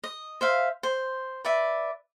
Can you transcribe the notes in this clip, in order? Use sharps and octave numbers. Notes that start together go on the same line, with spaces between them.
D#5
C5 E5 F5
C5
B4 D5 E5